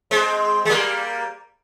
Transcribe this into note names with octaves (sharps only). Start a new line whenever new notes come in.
G#3 C4
G#3
G3 A#3